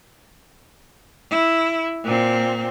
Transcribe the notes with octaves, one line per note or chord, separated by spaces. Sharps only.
E4
A#2 C4